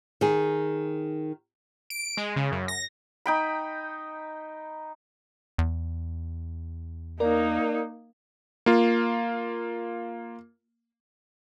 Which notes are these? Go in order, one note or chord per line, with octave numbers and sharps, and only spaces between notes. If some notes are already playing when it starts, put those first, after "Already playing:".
D#3 G#4
D7
G#3
C#3
F#2
A#6
D#4 G5 B5
E2
A#3 D#4 A#4 D5
A#3 F4